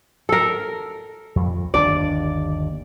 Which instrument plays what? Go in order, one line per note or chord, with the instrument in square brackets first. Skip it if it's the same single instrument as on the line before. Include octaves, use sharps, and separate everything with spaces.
[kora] A4 A#4
[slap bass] F2
[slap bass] G1 D#2 D4 [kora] D5